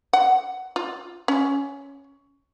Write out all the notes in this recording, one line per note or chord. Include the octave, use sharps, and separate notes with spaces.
F#5
F4
C#4